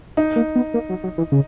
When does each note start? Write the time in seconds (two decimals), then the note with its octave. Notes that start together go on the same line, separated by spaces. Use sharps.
0.17 D#4
0.36 A#3
0.55 B3
0.74 A#3
0.89 F#3
1.04 F#3
1.18 E3
1.32 C#3